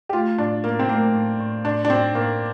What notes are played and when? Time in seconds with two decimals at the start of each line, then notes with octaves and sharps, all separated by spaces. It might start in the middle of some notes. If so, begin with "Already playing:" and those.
0.09 G4
0.13 A3 F4
0.38 A2 D4
0.64 A2 A#3
0.79 C4
0.89 A3 A#3
1.14 A2
1.40 A2
1.65 A2 D4
1.85 D4
1.89 A2 C4
2.15 A2 A#3